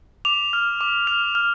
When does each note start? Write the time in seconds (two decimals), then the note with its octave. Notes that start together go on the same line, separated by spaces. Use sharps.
0.25 D6 F7
0.53 F6
0.81 D6
1.07 F6 F7
1.35 F6